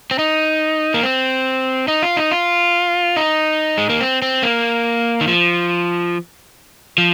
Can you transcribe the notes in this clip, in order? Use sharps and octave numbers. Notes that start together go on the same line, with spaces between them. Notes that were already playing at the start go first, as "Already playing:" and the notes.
C4
D#4
A#3
C4
D#4
F4
D#4
F4
D#4
G#3
A#3
C4
C4
A#3
D#3
F3
F3